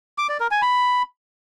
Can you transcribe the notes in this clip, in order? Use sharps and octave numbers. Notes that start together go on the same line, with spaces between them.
D6
D5
A#4
G#5
B5